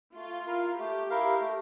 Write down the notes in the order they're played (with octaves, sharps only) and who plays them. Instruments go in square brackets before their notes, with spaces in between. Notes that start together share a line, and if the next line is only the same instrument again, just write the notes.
[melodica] A3 [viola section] F4
[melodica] E4 A#4 F5
[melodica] A3 [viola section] G4
[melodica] E4 A#4 F5
A3